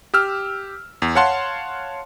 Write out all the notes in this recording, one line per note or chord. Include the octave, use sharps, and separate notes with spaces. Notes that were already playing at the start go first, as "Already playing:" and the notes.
G4 E6 F6
E2
C#5 F5 F#5 A5 C6